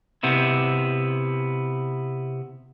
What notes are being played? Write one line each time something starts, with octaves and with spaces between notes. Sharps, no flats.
C3 B3 E4